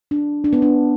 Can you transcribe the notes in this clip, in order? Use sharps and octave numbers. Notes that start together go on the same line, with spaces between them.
D4
D4
B3
D4